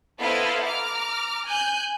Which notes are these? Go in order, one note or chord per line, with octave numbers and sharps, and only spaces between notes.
B3 E4 A4 C5 D#5 F5
A#5 D6 F6
G#5 F#6 G6